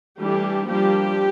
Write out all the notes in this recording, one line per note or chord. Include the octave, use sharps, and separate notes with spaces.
E3 G3 A3 D4 G4
F3 G3 A#3 D4 G4